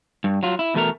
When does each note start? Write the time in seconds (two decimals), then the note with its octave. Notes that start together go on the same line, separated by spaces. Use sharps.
0.24 G2
0.43 F#3 F4
0.59 E4
0.74 E2 B2 A3 E4 A#4